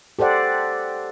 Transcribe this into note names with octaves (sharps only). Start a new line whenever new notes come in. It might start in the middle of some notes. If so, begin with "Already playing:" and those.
G4 A4 C5 D5 F#5